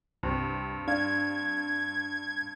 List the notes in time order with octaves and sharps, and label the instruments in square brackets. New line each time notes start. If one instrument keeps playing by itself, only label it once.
[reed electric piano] C2 [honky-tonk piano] G2 C4
[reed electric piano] D4 F5 [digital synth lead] G#6